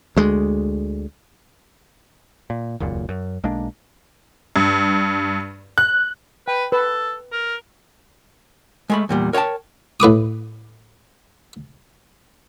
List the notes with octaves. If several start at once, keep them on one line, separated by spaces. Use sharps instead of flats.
D2 G#3
A#2
D#1 C#2 F#2 A#2
F#2
B1 G#3 A#3 D4
G2
F#6
B4 G5
A4 B4
A#4
G#3 A3 B5
E2 A#2 G3
A#4 C#5 F5 G5 A5
A2 B4 D6 D#6